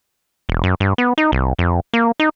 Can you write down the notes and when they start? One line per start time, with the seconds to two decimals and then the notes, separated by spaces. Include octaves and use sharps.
0.49 E1
0.64 F#2
0.80 G2
0.98 B3
1.18 D#4
1.32 C2
1.59 F2
1.93 A#3
2.20 D#4